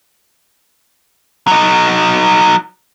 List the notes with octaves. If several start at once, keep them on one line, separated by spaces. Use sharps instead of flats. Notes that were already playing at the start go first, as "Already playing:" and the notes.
F#3 D#4